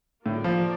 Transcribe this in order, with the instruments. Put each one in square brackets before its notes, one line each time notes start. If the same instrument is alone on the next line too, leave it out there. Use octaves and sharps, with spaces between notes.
[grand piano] A2 [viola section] A#3 F4 A#4 D5
[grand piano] F3